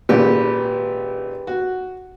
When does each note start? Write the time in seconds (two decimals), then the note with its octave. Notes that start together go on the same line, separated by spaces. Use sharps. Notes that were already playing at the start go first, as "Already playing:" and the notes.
0.09 G#1 A#2 C#3 G4 B4
1.47 F#4